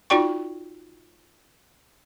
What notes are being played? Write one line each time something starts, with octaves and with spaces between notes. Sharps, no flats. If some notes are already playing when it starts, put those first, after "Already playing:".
D#4 F4 F#4 D5 G5 C#6